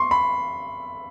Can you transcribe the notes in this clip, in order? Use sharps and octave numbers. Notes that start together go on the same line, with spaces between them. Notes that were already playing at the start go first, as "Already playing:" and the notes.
Already playing: C6 C#6
B5